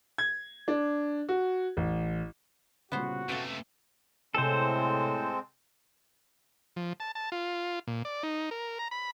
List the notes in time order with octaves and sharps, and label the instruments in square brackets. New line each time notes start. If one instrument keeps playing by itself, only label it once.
[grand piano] G#6
D4
F#4
A1
[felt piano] C2 A#2 C#3 [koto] B3 C5 [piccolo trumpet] F#4
[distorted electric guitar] C3 A3 [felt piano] C#4 B4 E5 [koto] A4 F5 G5
[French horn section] A2 [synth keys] C3 G#5 [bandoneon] G#3 C4 [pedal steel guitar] A4 C5
[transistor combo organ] F3
A5
A5
F4
A#2
D5
D#4
A#4
A#5
B5